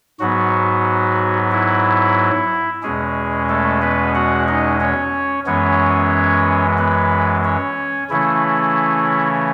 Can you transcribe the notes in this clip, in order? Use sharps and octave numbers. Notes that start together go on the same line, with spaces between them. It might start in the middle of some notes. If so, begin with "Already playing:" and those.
G#2 F#3 B3 F#4
E4
E2 B2 G#3 C#4 G#4
A3 A4
B3 B4
F#4 F#5
D#4 D#5
C#4 C#5
F#2 E3 G#3 B3 C#4 C#5
B3 B4
C#4 C#5
C#3 E3 A3 C#4 E4